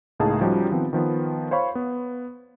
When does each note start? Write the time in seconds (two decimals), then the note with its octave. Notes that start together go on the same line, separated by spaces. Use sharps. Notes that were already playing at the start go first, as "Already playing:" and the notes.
0.20 C#2 A2 A#3 D#4 G#4 A5
0.41 F3 G3 C#4 D#4 F#4 G4
0.71 D#3 F3 B3 C4
0.93 D#3 F3 B3
1.51 C5 C#5 F5 B5 C#6
1.75 B3